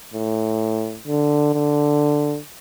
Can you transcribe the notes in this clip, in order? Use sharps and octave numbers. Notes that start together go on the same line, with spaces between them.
A2
D3
D3